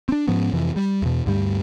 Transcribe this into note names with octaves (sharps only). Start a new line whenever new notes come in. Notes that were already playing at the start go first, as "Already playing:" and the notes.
C4 D4
G#2 F3 B3 C#4
F2 C3 E3
G3
E2 B2
D2 G2 G3